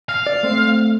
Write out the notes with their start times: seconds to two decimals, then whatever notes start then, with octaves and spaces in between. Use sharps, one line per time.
0.09 F5
0.27 D5
0.43 A3 C4